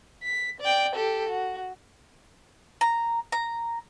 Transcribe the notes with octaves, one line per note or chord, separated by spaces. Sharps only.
B6
D5 G5
G4 A4
F#4
A#5
A#5